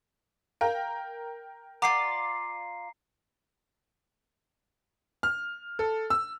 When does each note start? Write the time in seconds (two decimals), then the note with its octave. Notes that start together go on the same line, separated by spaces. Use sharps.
0.61 A#4 F5 G5
1.82 F4 D5 F#5 A#5 C7
5.23 F6
5.79 A4
6.10 E6